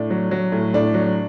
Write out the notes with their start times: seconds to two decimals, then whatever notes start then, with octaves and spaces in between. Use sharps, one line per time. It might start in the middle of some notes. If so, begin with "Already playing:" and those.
Already playing: A2 D4
0.10 F#3
0.31 F#3
0.52 A2
0.74 A2 D4
0.94 F#3